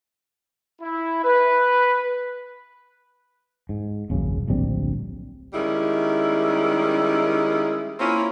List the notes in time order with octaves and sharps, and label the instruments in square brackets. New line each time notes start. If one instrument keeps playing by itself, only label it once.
[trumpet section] E4
B4
[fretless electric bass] G#2
D#1 A#1 F#2 C#3
D1 A#1 G3 C4
[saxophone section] D#3 G3 G#3 C#4 E4
A#3 C4 C#4 E4 F4